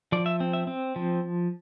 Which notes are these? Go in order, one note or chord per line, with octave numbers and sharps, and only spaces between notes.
F3 D5
E5
C4
E5
C4
F3